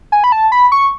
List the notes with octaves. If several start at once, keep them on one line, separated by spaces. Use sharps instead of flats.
G#5
B5
A5
B5
C#6